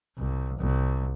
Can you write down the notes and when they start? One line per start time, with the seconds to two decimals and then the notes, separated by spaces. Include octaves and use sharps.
0.18 C2
0.59 C2